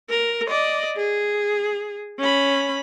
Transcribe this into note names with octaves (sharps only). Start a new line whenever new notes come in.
A#4
D5 D#5
G#4
C#4 B5